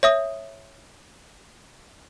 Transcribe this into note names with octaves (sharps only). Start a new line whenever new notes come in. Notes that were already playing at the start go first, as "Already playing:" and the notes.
C#5 E5 D#6